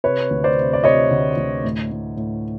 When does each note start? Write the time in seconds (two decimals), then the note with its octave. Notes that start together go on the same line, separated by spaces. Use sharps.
0.04 C3 B4 C#5
0.31 D2
0.44 C5 D5
0.57 C3
0.73 D5
0.84 C3 C#5 D#5
1.11 D2
1.37 D2
1.64 A2
1.92 A2
2.17 A2